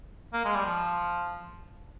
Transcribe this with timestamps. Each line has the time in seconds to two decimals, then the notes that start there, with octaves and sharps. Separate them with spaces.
0.33 A#3
0.45 G#3
0.55 G3
0.65 F3